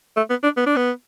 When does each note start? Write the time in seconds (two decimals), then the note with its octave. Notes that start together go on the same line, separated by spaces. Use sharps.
0.17 A3
0.30 B3
0.43 D4
0.57 B3
0.67 D4
0.76 B3